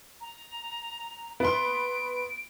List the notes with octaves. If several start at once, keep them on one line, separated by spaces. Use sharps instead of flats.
A#5
B3 C6 D7